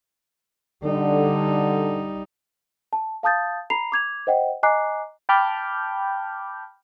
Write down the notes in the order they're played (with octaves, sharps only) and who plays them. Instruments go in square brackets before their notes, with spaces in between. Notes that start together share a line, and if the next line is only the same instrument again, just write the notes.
[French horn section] D3 [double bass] G3 D#4
[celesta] A5
F5 A5 D#6 G6 A6
A#5 B5 C7 F7
D6 G#6 F7
C5 D#5 F#5 G5
D#5 G#5 A#5 D6 F#6 C7
[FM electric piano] G5 A5 B5 D6 F6 G6